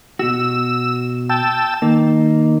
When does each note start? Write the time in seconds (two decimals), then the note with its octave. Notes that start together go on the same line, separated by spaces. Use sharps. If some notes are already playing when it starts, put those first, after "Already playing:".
0.19 B2 F#4 E6
1.29 G5 A5 E6
1.82 D#3 A#3